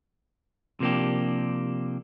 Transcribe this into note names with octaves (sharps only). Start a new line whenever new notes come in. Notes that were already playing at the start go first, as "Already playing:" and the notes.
C3 F3 A#3 D4 G4